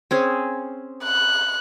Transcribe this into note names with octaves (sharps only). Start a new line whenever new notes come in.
C4 C#4 G#4
F#6